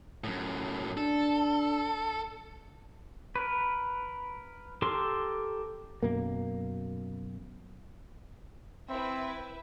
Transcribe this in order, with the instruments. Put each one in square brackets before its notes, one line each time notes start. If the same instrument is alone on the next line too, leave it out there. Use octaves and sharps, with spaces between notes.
[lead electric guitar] F#2 A2
[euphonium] D4 [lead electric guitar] A4
[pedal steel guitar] A#4 B4
G4 A4 A#4 C6
[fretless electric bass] F#2 B2 A#3
[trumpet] C4 [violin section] E4 B4 E5